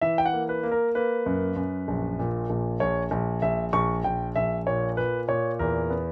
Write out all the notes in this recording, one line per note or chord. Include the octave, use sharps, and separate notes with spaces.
E3 E5
G5
F#5
A#3
B4
A#3
A#4
A#3 B4
F#2
F#2
A#1
A#2
A#1
A#1 C#5
A#1
A#1 E5
A#1 C#6
A#1 G5
A#1 E5
A#2 C#5
A#2 B4
A#2 C#5
E2 A#4
B3